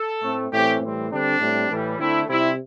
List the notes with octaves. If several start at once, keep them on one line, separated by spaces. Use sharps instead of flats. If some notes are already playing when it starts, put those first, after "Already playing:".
Already playing: A4
A2 A3 C4
A2 E3 A3 C4 G4
A2 E3 G3 C4
D3 G3 C4 D4
A2 G3 C4
A2 E3 G3
D3 A3 C4 E4
C3 G3 C4 E4